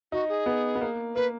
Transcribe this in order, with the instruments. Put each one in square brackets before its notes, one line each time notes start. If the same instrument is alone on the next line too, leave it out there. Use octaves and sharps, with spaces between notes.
[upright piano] D#4 [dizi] F#4
[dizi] G#4
[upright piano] B3
B3
A#3
[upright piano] A#3 [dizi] B4